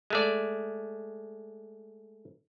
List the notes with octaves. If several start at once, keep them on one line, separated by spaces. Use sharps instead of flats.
G#3 A3 D5